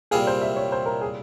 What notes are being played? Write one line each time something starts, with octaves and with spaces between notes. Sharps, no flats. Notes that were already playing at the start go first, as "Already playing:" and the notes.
C2 A#2 G3 C4 F4 G#4
C5
E5
C#5
C5
A#4
G#4